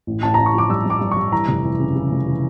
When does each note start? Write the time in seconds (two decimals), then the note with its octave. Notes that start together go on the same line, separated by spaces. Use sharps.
0.07 A1
0.23 A1 A5
0.34 A1 A#5
0.46 C#6
0.54 F3 D6
0.69 G2 E6
0.85 G2 D6
1.01 G2
1.11 C#6
1.16 G2
1.32 E3 A#5
1.48 F1
1.64 E3
1.79 C#3
1.95 C#3
2.11 F1
2.27 E3